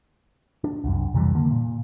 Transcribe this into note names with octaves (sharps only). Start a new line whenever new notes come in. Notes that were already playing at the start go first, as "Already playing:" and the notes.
D4
C2 F#2
F2 C3 E3 G3
D3 D#3 A#3
A#2